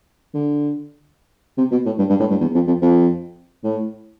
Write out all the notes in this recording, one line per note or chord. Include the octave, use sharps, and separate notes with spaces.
D3
C3
B2
A2
G2
G2
A2
G2
E2
F2
F2
F2
A2